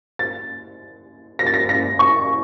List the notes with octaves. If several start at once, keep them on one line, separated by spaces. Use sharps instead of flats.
A6
A#6
A6
A#6
A#6
C#6